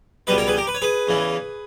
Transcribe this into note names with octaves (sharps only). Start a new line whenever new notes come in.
C#2 B2 G3 B4 D#5
A#4 C#5
G#4 B4
G4 A#4
B4
C#5
G#4 B4
E2 C#3 E3